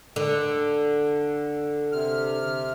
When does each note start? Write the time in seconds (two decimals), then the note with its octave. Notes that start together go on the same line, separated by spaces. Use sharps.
0.16 D3
1.92 C3 F6